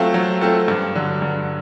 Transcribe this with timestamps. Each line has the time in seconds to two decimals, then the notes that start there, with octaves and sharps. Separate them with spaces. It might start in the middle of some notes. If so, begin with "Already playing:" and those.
Already playing: F#3 A3 C4 F4 A4
0.14 F#3
0.41 A3 C4 F4 A4
0.68 G2
0.95 D3 F#3
1.22 G2